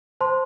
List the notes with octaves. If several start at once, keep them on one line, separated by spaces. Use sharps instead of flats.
C5 A5 C6